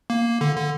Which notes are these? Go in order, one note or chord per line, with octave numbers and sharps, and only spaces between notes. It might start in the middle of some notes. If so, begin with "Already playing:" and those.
A#3
D3
D3